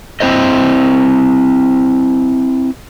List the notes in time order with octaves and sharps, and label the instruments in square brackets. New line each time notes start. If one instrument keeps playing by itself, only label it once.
[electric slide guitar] C4 E4 C5 D#5